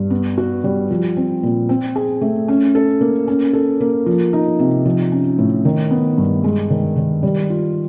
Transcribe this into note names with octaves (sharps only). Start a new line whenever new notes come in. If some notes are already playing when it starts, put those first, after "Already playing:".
Already playing: G2
B3
F#4
G3
F3
C4
A#2
C4
G#4
A3
C#4
A4
A#3
C#4
A4
A#3
F3
D#4
C3
F3
C#4
A2
D#3
B3
G2
G#3
D#3
D#3
G3
F4